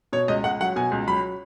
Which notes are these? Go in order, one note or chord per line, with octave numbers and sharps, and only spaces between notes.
B2 C#5
C#2 D#5
C#2 F#5
F#3 F#5
B2 G#5
C#2
F#3 B5